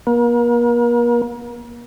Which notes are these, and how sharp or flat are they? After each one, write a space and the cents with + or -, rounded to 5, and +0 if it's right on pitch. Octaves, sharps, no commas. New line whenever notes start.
A#3 +40